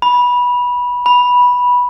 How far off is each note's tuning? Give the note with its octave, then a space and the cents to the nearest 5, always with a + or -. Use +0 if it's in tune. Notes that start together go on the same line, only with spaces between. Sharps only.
B5 -15
B5 -10